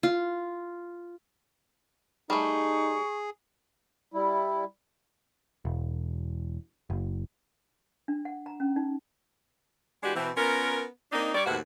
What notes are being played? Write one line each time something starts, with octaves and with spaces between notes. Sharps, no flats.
F4
G3 A3 D#4 G#4 C#6
G3 E4
E1
F#1
D4
F#5
A#5
C#4
D#4
E3 G#3 D4 F#4 G4
B2 E3 C4
B3 C#4 F4 A#4
A#3 C4 D4 D#4
G3 C#5 D5
D#2 A2 C3 F#4 B4 F#5